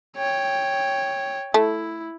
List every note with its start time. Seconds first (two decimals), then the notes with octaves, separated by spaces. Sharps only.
0.17 C#5 G5
1.54 A3 E4